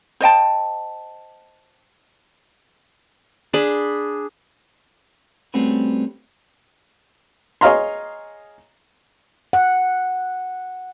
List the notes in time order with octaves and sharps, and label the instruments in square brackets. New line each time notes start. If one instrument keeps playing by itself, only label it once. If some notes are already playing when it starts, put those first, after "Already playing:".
[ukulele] C5 D#5 G5 A5
[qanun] D4 G#4 B5
[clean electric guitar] G3 A3 C4 C#4 F#4 B4
[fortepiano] G#4 C#5 D#5 F5 A#5 C6
[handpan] F#5